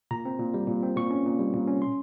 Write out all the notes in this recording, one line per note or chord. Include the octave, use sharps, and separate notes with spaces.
A#2 A#5
C4
A#2
G3
A#2
C4
A#2 C#6
C#4
A#2
G3
A#2
C#4
C6